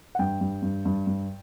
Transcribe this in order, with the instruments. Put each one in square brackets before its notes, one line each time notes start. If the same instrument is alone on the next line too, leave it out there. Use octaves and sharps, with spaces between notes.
[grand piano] F#5
G2 G5
G2
G2
G2
G2